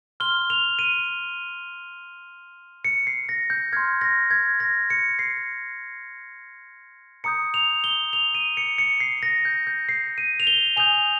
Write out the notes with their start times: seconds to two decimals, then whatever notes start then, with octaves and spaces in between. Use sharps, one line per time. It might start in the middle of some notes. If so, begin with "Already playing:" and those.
0.20 C6 F6 G7
0.50 F7
0.79 D#7
2.85 C#7
3.07 C7
3.29 A#6
3.50 G6
3.73 C6 F6 G#6
4.01 A#6
4.31 G#6
4.60 A#6
4.90 C#7
5.19 C7
7.24 A#5 D#6 G6 C#7
7.54 F7
7.84 G7
8.13 F7
8.35 D#7
8.57 C#7
8.78 C#7
9.00 C7
9.23 A#6
9.45 G6
9.67 G6
9.89 C7
10.18 D#7
10.40 F7
10.47 G7
10.77 G#5 D#6 G6 F7